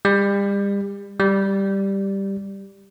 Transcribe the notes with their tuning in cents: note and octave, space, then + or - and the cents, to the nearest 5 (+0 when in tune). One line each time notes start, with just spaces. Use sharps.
G3 +35
G3 +0